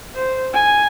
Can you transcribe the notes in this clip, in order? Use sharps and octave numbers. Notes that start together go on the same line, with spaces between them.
C5
G#5